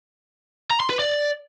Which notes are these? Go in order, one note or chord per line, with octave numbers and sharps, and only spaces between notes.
A#5
C6
B4
D5